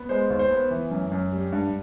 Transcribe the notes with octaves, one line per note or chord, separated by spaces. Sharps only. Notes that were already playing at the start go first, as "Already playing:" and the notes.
Already playing: B3
G#3 C5
D#2
C5
B3
E3
F#2
F#2
G3
G2